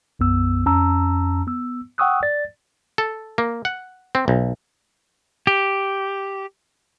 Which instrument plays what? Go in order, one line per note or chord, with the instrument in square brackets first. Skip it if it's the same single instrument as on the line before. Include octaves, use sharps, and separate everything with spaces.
[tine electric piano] B1 F#2 B3 E6
F2 C#4 A5 A#5 E6
B3 E6
F#5 G5 C#6 D#6 E6 F#6
D5 A6
[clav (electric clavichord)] A4
A#3
F#5
C4
B1
[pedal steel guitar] G4